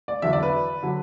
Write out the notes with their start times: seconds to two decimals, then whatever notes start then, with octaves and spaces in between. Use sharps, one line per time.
0.08 D5
0.22 E2 D3 F#3 E5
0.33 D5
0.43 B4
0.83 D3 F#3